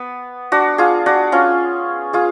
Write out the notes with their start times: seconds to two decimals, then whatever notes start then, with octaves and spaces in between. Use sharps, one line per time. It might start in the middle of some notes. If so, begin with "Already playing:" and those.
Already playing: B3
0.52 D4 F#4
0.78 F4 G#4
1.06 D4 F#4
1.32 C#4 F4
2.13 F4 G#4